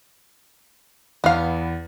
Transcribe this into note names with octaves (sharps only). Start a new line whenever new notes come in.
E2 B3 F5